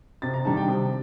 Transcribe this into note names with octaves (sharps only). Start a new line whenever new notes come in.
C3 A6
A#5
D#3 G3 D4 A5
G5
C3